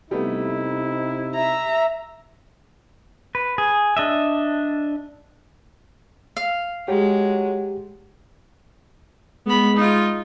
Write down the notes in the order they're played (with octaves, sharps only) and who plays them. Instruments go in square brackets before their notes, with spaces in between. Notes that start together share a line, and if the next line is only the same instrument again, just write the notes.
[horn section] C3 D#4 E4 [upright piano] G3 A3 B3
[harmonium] E5 [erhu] A#5
[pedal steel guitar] B4
G#4
D4 D#5 E5
[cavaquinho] F5
[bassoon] F#3 [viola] G#3 [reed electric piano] G4
[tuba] G#3 [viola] B3 B5
[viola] D#4 F4